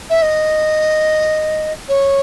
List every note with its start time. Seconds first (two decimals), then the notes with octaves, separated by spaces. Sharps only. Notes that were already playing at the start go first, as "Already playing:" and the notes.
0.10 E5
0.22 D#5
1.88 C#5